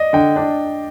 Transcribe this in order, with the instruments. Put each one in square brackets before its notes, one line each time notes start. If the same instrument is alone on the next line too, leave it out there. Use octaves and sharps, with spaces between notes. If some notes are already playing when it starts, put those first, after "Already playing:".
Already playing: [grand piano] D5 D#5
[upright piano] D3 [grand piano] G5
[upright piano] D4